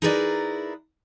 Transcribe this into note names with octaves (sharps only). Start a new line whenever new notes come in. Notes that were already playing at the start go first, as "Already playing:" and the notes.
D#4 E4 G#4 A#4 B4 D5